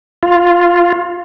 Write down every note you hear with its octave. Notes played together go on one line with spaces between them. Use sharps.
F4